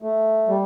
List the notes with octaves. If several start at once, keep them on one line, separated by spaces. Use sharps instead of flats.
A3
G3